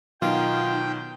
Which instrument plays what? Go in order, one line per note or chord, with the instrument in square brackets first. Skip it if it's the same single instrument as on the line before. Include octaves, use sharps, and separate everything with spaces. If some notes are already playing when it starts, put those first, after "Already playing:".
[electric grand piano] B2 D#3 F#3 [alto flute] D#4 [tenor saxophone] F4 [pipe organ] G5